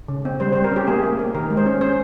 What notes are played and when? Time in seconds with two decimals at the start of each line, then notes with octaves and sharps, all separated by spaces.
0.08 C#3
0.25 C4
0.40 G3 C5
0.53 G3 C5
0.64 A#4
0.72 C#4 G4
0.87 A#3 G#4
1.03 A#3
1.19 A#3
1.35 D#3 A#4
1.50 G#3
1.57 C5
1.66 C#4
1.81 C#4 C5